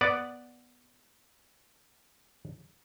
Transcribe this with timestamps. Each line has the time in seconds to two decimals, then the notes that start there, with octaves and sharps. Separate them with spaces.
0.01 B3 D5